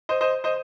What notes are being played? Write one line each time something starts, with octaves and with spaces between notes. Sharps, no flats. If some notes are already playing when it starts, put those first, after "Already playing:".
C5 D#5
C5 D#5
C5 D#5